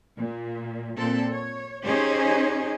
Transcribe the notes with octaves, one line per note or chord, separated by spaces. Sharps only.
A#2
A#2 C4 A4
C#5
C#4 D#4 G4 G#4 C5 C#5